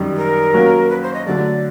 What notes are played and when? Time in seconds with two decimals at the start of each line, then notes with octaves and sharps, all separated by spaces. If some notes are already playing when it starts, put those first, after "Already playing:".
Already playing: F#2 D#3 G3
0.17 A#4
0.54 F#3 A#3 C#4 F#4
0.89 B4
1.02 C5
1.14 D#5
1.26 D3 F#3 A3 D5